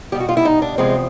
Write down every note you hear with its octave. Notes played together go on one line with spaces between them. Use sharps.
B2 G3 G4
F#4
F4
E4
D#4
D4
E2 C3 F3 G#3 C4